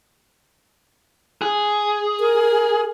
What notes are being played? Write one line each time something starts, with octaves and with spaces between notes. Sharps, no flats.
G#4
A#4